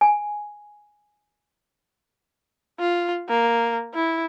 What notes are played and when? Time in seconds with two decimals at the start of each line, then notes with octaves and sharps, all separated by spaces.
0.01 G#5
2.80 F4
3.29 A#3
3.95 E4